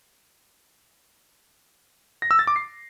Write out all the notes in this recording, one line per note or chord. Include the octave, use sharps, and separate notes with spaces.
A#6
E6
A6
D6
C7